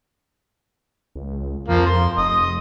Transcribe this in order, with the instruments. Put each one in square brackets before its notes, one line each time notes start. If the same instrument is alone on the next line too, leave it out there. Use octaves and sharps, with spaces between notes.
[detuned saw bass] C#2
[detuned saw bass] F2 [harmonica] F3 A#3
[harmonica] C6
[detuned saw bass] F1 [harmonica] D#5